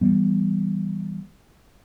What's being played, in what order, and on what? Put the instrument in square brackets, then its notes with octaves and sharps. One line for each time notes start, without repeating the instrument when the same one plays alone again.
[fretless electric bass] E3 G3 B3